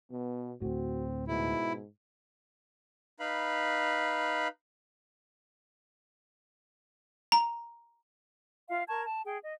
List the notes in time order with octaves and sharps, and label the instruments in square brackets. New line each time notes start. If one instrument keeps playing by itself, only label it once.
[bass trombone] B2 [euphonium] B3
[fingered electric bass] D2 A2 [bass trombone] C4 [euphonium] F#4
[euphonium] G#2 [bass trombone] B2 [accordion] E4
[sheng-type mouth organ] D#4 B4 F5 B5
[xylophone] A#5
[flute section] F4 E5 F5
A#4 A5 C#6 G#6
A5
G#4 G5
D#5